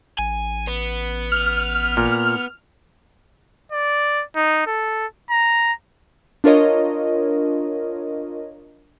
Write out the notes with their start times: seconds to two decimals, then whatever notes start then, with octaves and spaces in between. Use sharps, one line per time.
0.18 A1 G#5
0.67 B3
1.32 F6
1.97 A#2
3.72 D5
4.36 D#4
4.67 A4
5.30 A#5
6.44 D4 F4 A#4 C#5 D#5